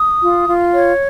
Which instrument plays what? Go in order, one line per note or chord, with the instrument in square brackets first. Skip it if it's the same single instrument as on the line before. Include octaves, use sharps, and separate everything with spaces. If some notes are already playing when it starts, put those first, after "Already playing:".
Already playing: [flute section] D#6
F4
F4
C#5